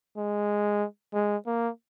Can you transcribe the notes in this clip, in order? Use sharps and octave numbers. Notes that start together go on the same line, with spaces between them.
G#3
G#3
A#3